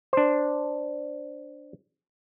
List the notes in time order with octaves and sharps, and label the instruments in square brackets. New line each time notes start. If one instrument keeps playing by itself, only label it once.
[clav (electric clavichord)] D4 C5